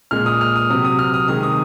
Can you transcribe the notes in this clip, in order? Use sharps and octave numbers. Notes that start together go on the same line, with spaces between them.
A#2 G#3 F6
D#6
F6
D#6
C3 F#3 D#6
D#6
F6
D#6
C3 D#3 G#3 D#6
D#6